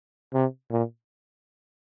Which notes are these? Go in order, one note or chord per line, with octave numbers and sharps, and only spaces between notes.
C3
A#2